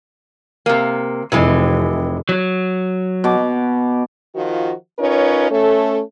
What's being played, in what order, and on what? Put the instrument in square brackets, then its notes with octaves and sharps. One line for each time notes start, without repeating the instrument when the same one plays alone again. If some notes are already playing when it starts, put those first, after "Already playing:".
[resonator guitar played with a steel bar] C3 A#3
[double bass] F1 [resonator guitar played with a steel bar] C3 E3 G#3
[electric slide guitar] F#3
[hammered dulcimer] B2 D6
[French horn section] D#3 F3 F4 F#4
C#4 D#4 F4 A#4 B4 C#5
A3 C#4 A4